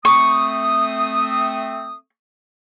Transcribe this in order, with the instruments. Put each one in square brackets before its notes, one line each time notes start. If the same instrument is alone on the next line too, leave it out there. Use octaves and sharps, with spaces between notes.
[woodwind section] A3 C4 D#6 [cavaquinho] C#6